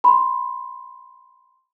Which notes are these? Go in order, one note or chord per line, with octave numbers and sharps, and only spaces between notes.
B5 C6